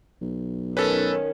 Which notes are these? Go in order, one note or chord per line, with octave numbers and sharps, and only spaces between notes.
B1
D#3 C#4 A4 B4